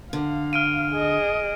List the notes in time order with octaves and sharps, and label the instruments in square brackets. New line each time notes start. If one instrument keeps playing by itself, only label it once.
[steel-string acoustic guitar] D3 [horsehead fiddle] F5
[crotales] F6 D7 D#7
[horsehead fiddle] G#4 D#5